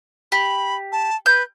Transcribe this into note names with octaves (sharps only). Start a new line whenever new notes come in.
G4 B5
A5
B4 G6